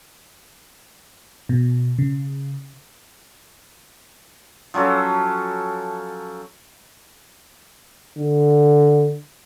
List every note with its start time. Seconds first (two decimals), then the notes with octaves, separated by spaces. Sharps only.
1.49 B2
1.98 C#3
4.74 F3 F#3 C#4 A4
8.17 D3